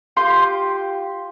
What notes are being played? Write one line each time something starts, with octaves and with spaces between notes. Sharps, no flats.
F4 G4 C6